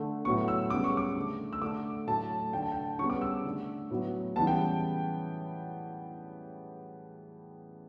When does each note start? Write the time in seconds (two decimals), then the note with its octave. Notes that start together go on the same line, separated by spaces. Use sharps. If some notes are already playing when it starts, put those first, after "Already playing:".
Already playing: D3 A3
0.25 A2 F#3 B3 C#6
0.48 E6
0.70 C#3 G3 B3 D6
0.84 C#6
0.97 D6
1.16 D3 A3
1.53 E6
1.62 D3 A3 D6
2.07 A2 F#3 A3 A5
2.53 D3 A3 G5
2.63 A5
2.72 G5
2.99 C#3 G3 B3 C#6
3.10 D6
3.21 E6
3.45 D3 A3
3.91 A2 F#3 B3
4.36 C#3 E3 G3 B3 A5
4.47 G5